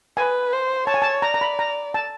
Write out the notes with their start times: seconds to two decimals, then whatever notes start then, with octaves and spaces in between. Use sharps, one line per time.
0.17 B4 G#5
0.53 C5
0.87 C#5 A5
0.94 G#5
1.02 A5
1.22 D5 A#5
1.34 A#5
1.41 B5
1.59 A#5
1.94 A5